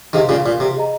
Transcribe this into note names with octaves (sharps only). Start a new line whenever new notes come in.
C3 D#3 G#4 C5 F5
A#2 C#3
A#2
C3
G#4 D#5 A#5